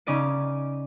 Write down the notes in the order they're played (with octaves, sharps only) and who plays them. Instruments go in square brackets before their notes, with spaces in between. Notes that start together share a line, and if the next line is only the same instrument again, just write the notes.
[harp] C#3 C#4 D#4 D5 D#7